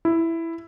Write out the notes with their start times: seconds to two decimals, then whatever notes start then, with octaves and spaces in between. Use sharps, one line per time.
0.05 E4